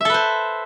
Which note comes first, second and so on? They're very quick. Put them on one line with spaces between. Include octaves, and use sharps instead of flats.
E5 A4 B4 C5